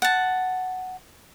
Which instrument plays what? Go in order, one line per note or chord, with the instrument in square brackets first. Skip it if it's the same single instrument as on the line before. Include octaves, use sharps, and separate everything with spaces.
[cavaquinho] F#5 A5